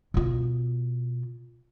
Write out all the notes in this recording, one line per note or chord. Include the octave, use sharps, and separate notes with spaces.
B2 F4